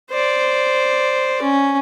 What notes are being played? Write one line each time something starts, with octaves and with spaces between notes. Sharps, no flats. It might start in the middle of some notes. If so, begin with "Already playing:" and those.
C5 D5
C#4